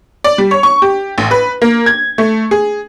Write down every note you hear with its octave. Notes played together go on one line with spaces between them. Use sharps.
D5
G3
C#5
C#6
G4
A1
B4
A#3
G#6
A3
G#4